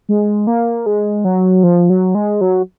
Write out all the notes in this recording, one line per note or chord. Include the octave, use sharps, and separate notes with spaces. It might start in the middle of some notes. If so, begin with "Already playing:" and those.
G#3
A#3
G#3
F#3
F3
F#3
G#3
F#3